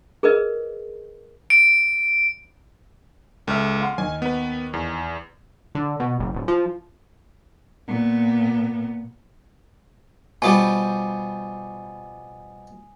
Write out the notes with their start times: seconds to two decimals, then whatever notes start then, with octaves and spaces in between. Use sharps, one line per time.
0.23 G#4 A#4 B4 D#5
1.50 D7
3.47 C#2 A4 E5 F6
3.81 F5 F#5 C6
3.98 D#2 D#4 G#5
4.22 B3 B4
4.73 E2
5.75 D3
6.00 B2
6.20 F#1
6.35 D1
6.48 F3
7.87 A#2 B3
10.42 B2 F3 G3 G#5 D#6 D#7